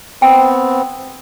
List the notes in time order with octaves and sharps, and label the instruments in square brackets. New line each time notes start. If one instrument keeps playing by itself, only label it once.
[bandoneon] B3 C4 [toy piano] G5